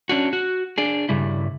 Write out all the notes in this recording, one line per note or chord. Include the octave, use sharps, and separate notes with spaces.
C#4 D4 F#4
F#4
D4 G#4
G2 C#3 G3 E4